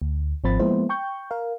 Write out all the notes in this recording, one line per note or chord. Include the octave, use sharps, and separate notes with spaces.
D2
G#1 F3 C4 F4 B5 A6
F3 G#3 A#3 B3 E4 C5
G5 C#6 G6
A#4 F5